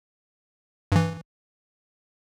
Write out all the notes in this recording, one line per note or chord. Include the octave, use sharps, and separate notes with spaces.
G2 E3